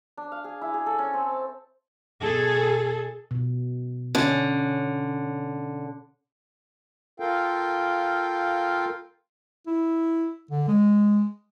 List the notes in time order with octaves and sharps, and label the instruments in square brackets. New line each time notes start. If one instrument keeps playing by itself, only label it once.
[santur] D4
F5
G#4
E4
G#4
A4
C#4
C4
A5
[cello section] B2 G#4 A4
[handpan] B2
[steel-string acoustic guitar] D3 [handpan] C#4
[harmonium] F4 A4 A#4 F5 G5
[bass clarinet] E4
D3
G#3